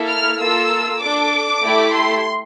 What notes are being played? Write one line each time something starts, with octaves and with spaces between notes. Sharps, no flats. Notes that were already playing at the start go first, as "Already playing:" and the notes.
Already playing: A#3 E4 A4
F6
A#3 F4 A4 E6
D4 A4 D6
A3 E4 G4
C6